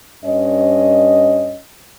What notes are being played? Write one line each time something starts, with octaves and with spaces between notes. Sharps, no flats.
G2 C#4 D#5